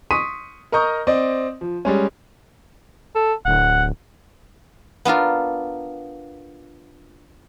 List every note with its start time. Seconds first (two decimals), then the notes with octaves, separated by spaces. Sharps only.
0.11 C6 C#6 D#6 B6 D#7
0.72 A#4 D#5 A#5 C#6 D#6 G6
1.07 C4 D5 D#5
1.61 F3
1.85 G3 G#3 C#4
3.15 A4
3.45 D1 F#5
5.05 B3 D4 F4 A#4